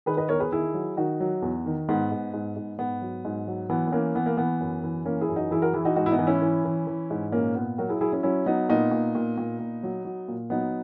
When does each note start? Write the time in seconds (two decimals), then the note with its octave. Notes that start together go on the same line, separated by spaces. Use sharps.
0.06 D#3 G#4 B4
0.17 B4 D#5
0.29 E2 A#4 C#5
0.40 G#4 B4
0.52 D#3 E4 G#4
0.74 F#3
0.97 D#3 D#4 F#4
1.20 F#3
1.42 E2
1.66 D#3
1.89 G#2 B3
2.11 G#2
2.34 G#2
2.56 G#2
2.78 G#2 B3
3.02 F#3
3.25 G#2
3.47 F#3
3.70 E3 B3
3.88 B3
3.92 E3 A#3 C#4
4.15 E3 B3
4.26 A#3
4.37 E3 B3
4.60 F#2
4.84 E3
5.05 E3 A#3 C#4
5.21 E4 G#4
5.29 F#2
5.36 D#4 F#4
5.51 E3 E4 G#4
5.62 F#4 A#4
5.73 E3 E4 G#4
5.85 D#4 F#4
5.96 G#2 D#4 F#4
6.06 E4
6.11 B3 D#4
6.19 E3
6.27 C#4 E4
6.42 E3
6.65 E3
6.87 E3
7.10 G#2
7.32 A#2 A#3 C#4
7.55 A#2 B3
7.78 F#3 F#4 A#4
7.89 E4 G#4
8.01 F#3 E4 G#4
8.13 C#4 E4
8.23 F#3 C#4 E4
8.46 F#3 B3 D#4
8.69 A#2 B3 D#4
8.92 A#2
9.15 A#2
9.38 A#2
9.60 A#2
9.83 F#3
10.05 F#3
10.28 A#2
10.50 F#3 B3 D#4